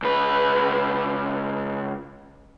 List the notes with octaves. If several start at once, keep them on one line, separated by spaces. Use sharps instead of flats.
C#2 B4